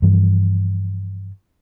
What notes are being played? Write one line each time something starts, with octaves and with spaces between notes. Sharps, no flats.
G2 E3 F3